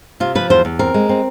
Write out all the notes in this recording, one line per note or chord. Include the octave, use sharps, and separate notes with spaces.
C3 F4
F3 B4
E2 C5
E2
C4 A#4
G#3
C4